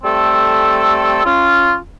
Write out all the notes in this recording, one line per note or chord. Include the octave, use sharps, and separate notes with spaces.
G3 A3 C4 A4
C#4 F4